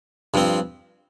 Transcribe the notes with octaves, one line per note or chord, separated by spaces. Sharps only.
G2 F3 C4